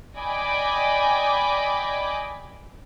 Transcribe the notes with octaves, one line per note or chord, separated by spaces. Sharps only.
D5 D#5 G5 G#5 B5 D6